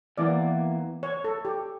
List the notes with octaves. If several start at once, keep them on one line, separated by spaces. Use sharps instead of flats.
E2 E3 A#3 D5
C#5
A4
G4